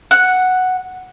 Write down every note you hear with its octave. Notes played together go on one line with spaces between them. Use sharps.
F#5